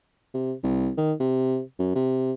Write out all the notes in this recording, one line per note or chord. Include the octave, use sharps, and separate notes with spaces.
C3
C2
D#3
C3
F#2
C3